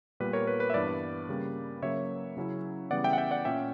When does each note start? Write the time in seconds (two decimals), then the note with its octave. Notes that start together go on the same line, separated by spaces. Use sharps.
0.20 A#2 G3 B3 B4
0.33 A#4 C#5
0.47 B4
0.60 B4
0.70 E5
0.74 G2 E3 B3 D4 B4 D5
1.29 C#3 G3 A#3
1.82 C#3 F#3 A#3 C#5 E5
2.37 C#3 F#3 C#4 E4
2.91 C#3 E3 G3 B3 D5 F#5
3.04 E5 G5
3.13 F#5
3.18 E5 G5
3.31 D5 F#5
3.45 A#2 A#3 C#4 E5 G5